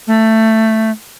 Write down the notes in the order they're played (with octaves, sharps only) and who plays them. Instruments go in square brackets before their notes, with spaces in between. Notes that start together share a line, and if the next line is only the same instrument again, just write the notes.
[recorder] A3